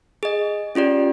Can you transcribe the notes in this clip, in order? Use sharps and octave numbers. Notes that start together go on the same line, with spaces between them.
G#4 D#5
C#4 F4 G4 D5